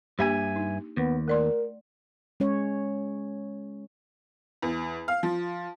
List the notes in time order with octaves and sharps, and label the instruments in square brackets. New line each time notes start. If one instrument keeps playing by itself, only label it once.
[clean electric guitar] G2 E5 G#5 [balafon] A#3 D4 G4
[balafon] D#4
[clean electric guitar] D#2 [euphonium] B3
[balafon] A3 D5 C6 [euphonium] A#4
[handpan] G#3 C#4 C#5
[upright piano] E2
F5
F3